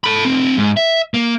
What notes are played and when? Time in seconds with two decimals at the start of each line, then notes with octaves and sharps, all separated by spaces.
0.04 A4 B5
0.25 A3 C4
0.57 G#2
0.77 E5
1.14 A#3